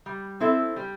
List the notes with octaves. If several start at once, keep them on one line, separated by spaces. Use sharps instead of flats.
G3
C4 E4 A4
G3